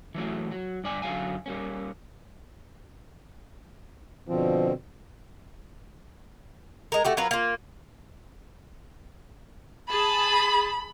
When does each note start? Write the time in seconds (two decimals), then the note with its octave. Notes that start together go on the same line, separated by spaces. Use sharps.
0.15 E3 F#3 A3 E4
0.51 F#3
0.84 G2 D5 G#5
1.02 F#2 D3 F#3 F5 G#5
1.46 G3 A#3 C#4
4.28 B2 D3 F3 C4
6.92 G#3 A#4
7.05 A3 F#4 G4
7.17 F#3 F4 A#4 B4
7.31 A#3 F4
9.89 G#4 A5 B5